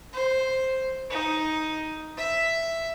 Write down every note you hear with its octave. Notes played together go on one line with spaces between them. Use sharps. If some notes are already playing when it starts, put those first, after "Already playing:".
C5
D#4
E5